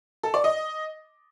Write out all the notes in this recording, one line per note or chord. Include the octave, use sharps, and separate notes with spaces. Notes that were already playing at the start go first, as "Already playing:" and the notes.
A4
D5
D#5